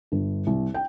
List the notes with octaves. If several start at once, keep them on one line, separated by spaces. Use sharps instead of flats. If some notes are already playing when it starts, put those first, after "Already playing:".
G1
C2
G5